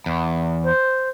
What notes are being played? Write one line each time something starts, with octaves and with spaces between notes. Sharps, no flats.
E2
C5